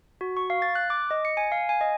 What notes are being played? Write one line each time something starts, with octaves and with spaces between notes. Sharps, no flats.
F#4
C#6
F5
A6
F#6
D6
D#5
C#7
G#5
F5
G#5
D#5